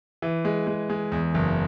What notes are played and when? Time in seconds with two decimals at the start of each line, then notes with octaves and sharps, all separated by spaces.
0.22 E3
0.45 G#3
0.67 G#3
0.90 G#3
1.12 E2
1.34 F#1